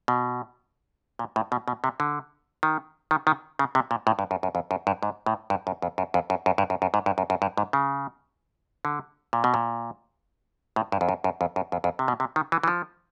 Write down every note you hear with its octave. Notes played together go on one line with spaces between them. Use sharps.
B2
A#2
A2
B2
B2
C3
D3
D#3
D#3
D#3
C#3
C3
A#2
A2
G2
F#2
F#2
F2
F#2
G2
G#2
A2
G2
F#2
F2
F#2
F2
F#2
F#2
G2
F#2
F#2
G#2
G2
F#2
F#2
G2
G#2
C#3
D3
A#2
B2
A#2
A2
G2
F2
F#2
F#2
F2
F#2
F2
F2
C3
B2
C3
D#3
E3
E3
F3